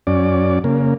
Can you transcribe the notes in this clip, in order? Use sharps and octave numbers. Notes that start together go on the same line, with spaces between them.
F#2 C#4 D5
C#3 A#3